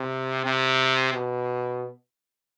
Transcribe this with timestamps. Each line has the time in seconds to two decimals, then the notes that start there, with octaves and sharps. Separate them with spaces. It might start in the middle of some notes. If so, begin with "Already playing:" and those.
Already playing: C3
0.45 C3
1.13 B2